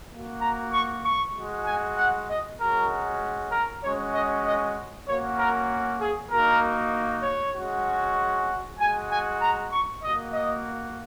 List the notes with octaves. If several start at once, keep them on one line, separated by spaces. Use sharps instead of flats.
A#3 F#4
A#5
C#6
C#6
G#3 F#4
G#5
F#5
D#5
G#3 C#4 F#4 A#4
A#4
G#3 C#4 F#4 C#5
D#5
D#5
A#3 C#4 F#4 C#5
A#4
G#4
A#3 D#4 F#4 A#4
C#5
G#3 C#4 F#4
G#3 F#4 G#5
G#5
A#5
C#6
A#3 F#4 D#5
D#5